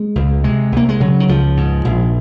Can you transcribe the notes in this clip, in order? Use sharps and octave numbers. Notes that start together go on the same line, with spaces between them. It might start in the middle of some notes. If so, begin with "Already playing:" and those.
Already playing: G#3
C#2
C3 G#3
C2 A#3
G#3
C#3 F#3
D#3
C#2 F3
G#2
A#1